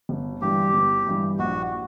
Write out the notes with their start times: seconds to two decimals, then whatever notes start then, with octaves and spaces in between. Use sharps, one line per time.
0.09 G1
0.42 G2 E3 G3 G4
0.74 G1
1.07 G2 E3 G3
1.39 A#1 F#4